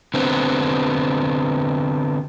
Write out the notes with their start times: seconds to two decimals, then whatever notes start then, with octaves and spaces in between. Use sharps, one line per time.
0.14 D3 B3 C4